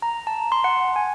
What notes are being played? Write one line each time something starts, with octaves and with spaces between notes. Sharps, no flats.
A#5
A5
C6
F#5
G#5